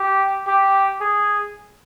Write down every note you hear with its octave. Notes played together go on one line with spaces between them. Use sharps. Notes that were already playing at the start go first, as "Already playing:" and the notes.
Already playing: G4
G4
G#4